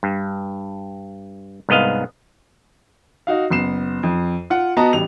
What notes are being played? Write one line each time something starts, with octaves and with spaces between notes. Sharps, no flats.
G2
C2 G#2 B3 D#5 F5
D#4 F#4 F5
F#1 B3 C7 E7
F2
F4 F#5
B3 F#4 D#5 A5 A#5
A1 G3 F7